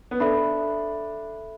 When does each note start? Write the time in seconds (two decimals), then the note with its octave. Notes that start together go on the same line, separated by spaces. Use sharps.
0.11 B3
0.20 D4 A4 E5 B5